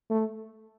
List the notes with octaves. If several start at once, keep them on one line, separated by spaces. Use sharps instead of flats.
A3